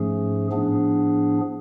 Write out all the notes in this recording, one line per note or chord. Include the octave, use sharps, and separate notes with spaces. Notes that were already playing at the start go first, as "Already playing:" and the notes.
Already playing: G#2 F3 A3 C#4 G#4
A2 F3 B3 D4 G#4